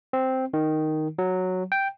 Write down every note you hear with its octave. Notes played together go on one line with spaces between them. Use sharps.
C4
D#3
F#3
G5